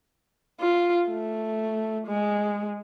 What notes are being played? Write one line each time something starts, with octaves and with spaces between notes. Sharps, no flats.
F4
A3
G#3